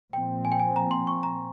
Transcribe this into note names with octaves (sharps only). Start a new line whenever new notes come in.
A#2 F3 C4 G5
G#5
G5
G#5
A#5
C6
C#6
A#5